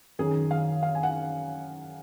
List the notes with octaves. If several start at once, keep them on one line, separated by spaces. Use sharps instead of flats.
F#2 D#3 G#4
F5
F5
G#5
F#5